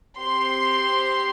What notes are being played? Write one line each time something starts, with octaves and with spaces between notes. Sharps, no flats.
C4 G4 C6